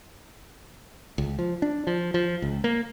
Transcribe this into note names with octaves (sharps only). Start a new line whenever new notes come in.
C#2
F3
D4
F3
F3
C#2
A#3